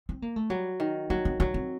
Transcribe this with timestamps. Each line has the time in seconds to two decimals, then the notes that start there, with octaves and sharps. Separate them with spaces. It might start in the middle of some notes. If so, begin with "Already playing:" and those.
0.09 C4
0.22 A#3
0.36 A3
0.50 F#3 G3
0.80 D#3
1.10 F#3 A#3
1.25 C4
1.40 F#3 D4
1.54 C4